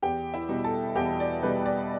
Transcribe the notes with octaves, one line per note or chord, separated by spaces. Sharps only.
E2 G4 G5
E4 E5
B2 G3
A4 A5
E2 G4 G5
D5
B2 G3 B4
D5